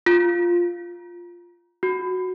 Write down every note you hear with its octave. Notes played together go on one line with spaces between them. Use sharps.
F4
F#4